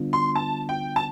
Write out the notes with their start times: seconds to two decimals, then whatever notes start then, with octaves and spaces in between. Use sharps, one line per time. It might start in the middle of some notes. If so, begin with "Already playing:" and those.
Already playing: D3 G3 B3 D4 F4
0.13 C6
0.36 A5
0.69 G5
0.96 A5